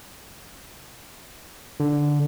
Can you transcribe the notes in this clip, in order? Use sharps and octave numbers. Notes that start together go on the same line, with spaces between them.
D3